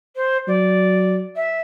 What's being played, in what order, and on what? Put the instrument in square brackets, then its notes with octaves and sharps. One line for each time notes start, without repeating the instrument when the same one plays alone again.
[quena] C5
[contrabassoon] F#3 [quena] D5
[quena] E5